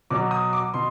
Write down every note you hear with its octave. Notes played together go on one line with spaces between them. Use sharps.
B2 F#3 D6
D#6
D6
B2 C6